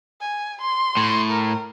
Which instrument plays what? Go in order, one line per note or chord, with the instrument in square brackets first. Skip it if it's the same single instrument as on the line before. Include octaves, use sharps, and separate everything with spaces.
[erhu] G#5
C6
[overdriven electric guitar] A2
[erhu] A#4